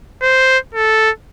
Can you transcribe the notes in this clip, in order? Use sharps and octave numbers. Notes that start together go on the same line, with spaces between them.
C5
A4